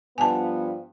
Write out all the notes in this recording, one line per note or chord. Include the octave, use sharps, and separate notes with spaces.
G2 F3 B3 G#5 A5